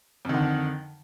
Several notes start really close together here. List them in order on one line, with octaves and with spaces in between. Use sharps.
F2 D#3 D3